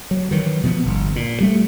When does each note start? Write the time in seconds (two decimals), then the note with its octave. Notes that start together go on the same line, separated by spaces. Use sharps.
0.11 F#3
0.31 D#3 E3 F#3
0.63 B2 F3 G#3 B3
0.86 G1
1.16 A#2
1.41 G3 A3